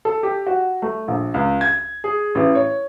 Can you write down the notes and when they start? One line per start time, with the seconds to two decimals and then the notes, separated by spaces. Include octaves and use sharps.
0.05 A4
0.23 G4
0.47 F#4
0.82 A3
1.08 A#1
1.34 C#2
1.61 G#6
2.04 G#4
2.35 A1
2.55 C#5